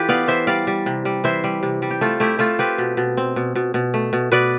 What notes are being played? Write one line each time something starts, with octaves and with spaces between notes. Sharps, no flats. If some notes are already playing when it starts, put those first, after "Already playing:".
Already playing: E3 F4 G4 A4 B4
B3 D5 F5
E3 C5 E5
G3 D5 F5
G3
C3
G3
E3 C5 E5
G3
C3
G3
G4
A3 F4 A4
A3 E4 G4
A3 F4 A4
C4 G4 B4
B2
B2
C4
B2
B2
B2
A3
B2
B2 B4 D5